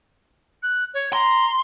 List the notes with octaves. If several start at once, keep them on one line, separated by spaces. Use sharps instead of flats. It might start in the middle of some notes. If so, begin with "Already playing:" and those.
F#6
C#5
A#5 C6